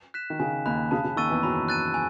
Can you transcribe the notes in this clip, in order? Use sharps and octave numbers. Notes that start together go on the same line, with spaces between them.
F#6 B6 E7
D#3
C#3 G#5
D#2 D#3 B5 F#6
C#3 A5
C#3
D#2 D#3 C#6 E6 A6 D#7
E2 E3
F#2 F#3 B5
F#6 A6 D#7
G#5